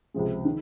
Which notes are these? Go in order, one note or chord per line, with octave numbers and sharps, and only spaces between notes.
C#2 C3 F3 G#3
D#3